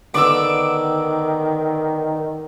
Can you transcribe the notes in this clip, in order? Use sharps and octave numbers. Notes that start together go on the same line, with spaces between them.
D3 D#3 B3 D5 D6 E6